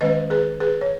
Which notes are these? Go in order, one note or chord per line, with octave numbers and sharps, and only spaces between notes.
D#3 G#3 C#4 B4 D#5
G#4 B4
G#4 B4
C#5